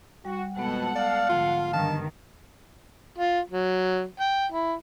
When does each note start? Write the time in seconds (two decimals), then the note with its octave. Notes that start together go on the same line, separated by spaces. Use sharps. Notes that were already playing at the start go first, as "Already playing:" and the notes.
0.25 G3 F#4 F#5
0.57 F2 B2 G#3 B3 A4 F#5
0.95 D5 F5
1.29 G#2 D3 F3 F4
1.73 G2 D3 D#3 D#4 A5 F6
3.18 F4
3.50 F#3
4.20 G5
4.52 E4